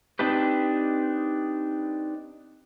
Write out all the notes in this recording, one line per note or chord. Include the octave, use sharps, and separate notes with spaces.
C4 D4 D#4 G4 B4